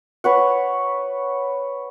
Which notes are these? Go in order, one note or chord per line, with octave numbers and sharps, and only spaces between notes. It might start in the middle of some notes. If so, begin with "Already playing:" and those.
B4 C#5 F#5